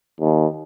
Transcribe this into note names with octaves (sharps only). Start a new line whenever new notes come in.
D#2